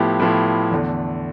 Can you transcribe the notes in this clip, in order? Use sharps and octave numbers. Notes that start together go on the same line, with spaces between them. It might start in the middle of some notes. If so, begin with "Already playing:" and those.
Already playing: A2 F3 B3 E4 G4
A2 F3 B3 E4 G4
E2 D3 A3